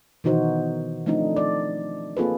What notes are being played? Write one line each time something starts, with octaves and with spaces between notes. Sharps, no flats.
B2 D#3 E3 D#4 F#4 C5
F3 A3 C4 D4 D#4
D5
A#3 C4 F4 G#4 A4 B4